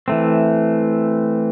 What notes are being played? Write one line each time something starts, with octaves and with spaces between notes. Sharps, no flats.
E3 A3 C4